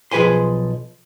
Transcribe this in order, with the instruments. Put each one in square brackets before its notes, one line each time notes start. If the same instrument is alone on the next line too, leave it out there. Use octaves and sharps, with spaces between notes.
[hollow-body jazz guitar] B1 F3 G#4 B4 G#5 C6